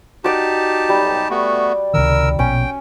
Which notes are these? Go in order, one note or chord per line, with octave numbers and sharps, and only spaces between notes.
D#4 F#4 G4 D5 A5
B1 G3
A3 B3 F#4 D5
C#2 C3 D#3 A#4 E6
A#1 B2 C#4 G5